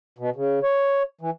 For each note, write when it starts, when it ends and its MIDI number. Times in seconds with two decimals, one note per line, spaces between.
0.18 0.30 47
0.36 0.59 49
0.63 1.03 73
1.21 1.30 52